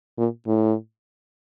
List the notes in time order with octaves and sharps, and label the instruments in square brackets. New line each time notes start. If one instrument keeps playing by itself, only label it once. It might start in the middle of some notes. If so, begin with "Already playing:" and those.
[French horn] A#2
A2